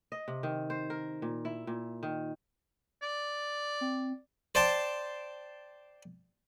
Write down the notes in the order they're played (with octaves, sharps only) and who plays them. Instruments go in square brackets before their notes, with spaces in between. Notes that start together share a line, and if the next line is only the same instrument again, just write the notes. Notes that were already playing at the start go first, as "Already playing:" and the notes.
[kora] D#5
C3
D#3
C5
A#4
A#2
E4
A#2
D#3
[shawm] D5
[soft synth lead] C4
[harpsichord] C5 D5 G5 A5 C6